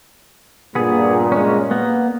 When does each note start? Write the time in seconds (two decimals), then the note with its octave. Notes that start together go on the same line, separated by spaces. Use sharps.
0.75 G2 A#2 B3 G#4
1.32 G#3 C#4
1.71 A#3 B3